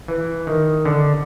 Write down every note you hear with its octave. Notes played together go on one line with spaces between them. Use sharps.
E3
D#3
D3